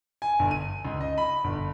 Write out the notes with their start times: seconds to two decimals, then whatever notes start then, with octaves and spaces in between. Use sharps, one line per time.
0.22 G#5
0.39 G1
0.51 D#7
0.85 C#2
1.01 D#5
1.18 B5
1.44 G1